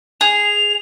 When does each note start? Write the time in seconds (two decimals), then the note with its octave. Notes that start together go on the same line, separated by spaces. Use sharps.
0.21 G#4 F7